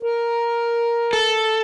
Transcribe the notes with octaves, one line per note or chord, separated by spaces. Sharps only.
A#4
A4